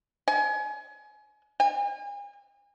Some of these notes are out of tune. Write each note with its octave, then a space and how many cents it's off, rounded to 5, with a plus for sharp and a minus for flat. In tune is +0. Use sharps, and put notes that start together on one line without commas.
G#5 +30
G#5 -40